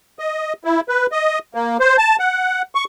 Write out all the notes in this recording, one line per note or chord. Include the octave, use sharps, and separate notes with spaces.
D#5
E4
B4
D#5
A#3
C5
A5
F#5
C#6